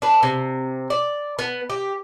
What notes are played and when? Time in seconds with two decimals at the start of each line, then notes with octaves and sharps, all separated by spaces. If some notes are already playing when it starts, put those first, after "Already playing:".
0.02 D4 B4
0.23 C3
0.90 D5
1.39 B3
1.70 G4